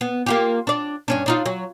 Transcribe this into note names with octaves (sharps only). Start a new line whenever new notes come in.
B3
A#3 F4 G4
D4 D5
G2 C#4 D4
D4 D#4 F4
F#3